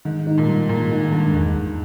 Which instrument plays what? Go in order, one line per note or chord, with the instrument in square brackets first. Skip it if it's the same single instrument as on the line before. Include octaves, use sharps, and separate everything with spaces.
[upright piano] G#2 [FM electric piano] D#3
[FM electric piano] D#4
[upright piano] A#2
[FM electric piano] G3
[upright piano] A#2 [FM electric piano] D#3
[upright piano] G#2 [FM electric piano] D#3
[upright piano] G2 [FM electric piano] G#3
[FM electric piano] E2 [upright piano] G#2
[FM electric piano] E2